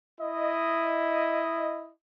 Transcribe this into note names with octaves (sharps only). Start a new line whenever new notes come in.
E4 D#5